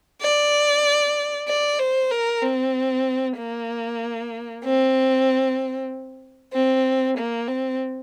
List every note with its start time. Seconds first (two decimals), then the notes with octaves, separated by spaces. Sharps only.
0.21 D5
1.48 D5
1.79 C5
2.11 A#4
2.42 C4
3.38 A#3
4.64 C4
6.53 C4
7.17 A#3
7.48 C4